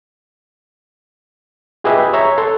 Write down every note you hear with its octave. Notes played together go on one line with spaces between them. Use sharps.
F4 G4 G#4 B4 D#5 E5
C#5 E5 A#5
A4 C6